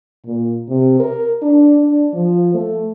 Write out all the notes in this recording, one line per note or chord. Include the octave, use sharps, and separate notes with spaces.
A#2
C3
A#4
D4
D4
F3
A3